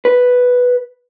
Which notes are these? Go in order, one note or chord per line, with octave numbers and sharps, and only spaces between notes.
B4